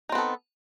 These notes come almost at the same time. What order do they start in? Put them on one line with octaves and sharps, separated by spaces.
D#4 C4 B3 A4